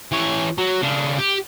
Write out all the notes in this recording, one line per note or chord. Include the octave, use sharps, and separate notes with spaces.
E3 C#5
F#3
C#3 D4
G4